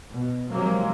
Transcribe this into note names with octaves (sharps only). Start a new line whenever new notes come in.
B2
C3 D#3 F3 F#3 G#3 A#3